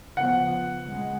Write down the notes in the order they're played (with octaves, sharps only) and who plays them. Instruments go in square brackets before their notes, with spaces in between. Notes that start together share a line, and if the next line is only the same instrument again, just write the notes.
[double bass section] C#3 F3 B3 [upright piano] F#5
[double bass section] C#3 G#3